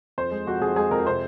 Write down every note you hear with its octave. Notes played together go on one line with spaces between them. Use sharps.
F2 C5
G#3
F2 F#4
F2 G#4
G#3 G#4
F2 A#4
C3 C5